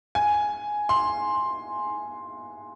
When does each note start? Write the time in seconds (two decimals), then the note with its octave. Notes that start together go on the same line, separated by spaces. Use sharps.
0.15 G#5
0.89 C6